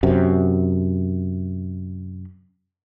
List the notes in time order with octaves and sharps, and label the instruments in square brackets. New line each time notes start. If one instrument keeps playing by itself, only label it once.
[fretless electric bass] F#2 C3